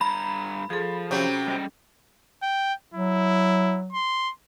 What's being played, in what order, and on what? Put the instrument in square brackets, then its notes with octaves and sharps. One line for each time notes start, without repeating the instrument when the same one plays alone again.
[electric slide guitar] G2 A#5 [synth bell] B5
[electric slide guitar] F3 [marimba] G#4 A4
[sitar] C3 F#3 [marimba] C#4 G6
[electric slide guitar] G3 D#5 G5
[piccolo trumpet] G5
[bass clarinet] F#3 [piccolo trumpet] E4
[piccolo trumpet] C6